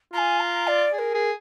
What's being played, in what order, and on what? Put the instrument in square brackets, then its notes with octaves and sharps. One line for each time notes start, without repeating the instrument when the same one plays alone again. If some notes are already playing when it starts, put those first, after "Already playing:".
[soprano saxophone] F4 [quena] G#5 A#5
[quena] A#5
D5
[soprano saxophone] G#4 [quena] D5
[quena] A#4
[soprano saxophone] G#4